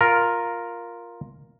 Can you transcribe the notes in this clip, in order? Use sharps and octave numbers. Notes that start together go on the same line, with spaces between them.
F4 A#4